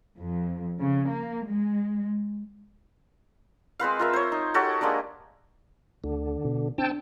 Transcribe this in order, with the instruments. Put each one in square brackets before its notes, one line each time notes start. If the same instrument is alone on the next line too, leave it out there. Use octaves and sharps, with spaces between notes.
[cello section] F2
C#3
A#3
G#3
[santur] G#3 C4 B4 F5
F4 A#4 E5
C5 C#5
D#4
F#4 G4 A4 C#5
G#3 A#3 D4 G4
[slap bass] D2 [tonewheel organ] D3
[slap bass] B2
[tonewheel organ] C4 G5 A5 [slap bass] D4